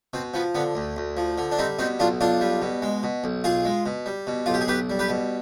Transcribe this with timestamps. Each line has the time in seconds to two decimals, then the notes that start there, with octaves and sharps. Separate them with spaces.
0.14 B2 C4
0.34 F3 B3
0.55 D3 B3
0.75 D2
0.97 D2
1.17 F3
1.38 D3
1.52 D4
1.58 G3 C4 D#4
1.79 B2 C4 D#4
1.99 B1 D4 F4
2.21 B1 D4 F4
2.41 G3
2.62 B2
2.82 G#3
3.03 B2
3.24 B1
3.44 B1 F4 G#4
3.65 G#3
3.86 B2
4.06 G3
4.27 B2
4.46 B1 F4
4.54 G4
4.61 G#4
4.68 B1 G4 B4
4.90 G3
4.99 G4 B4
5.09 B2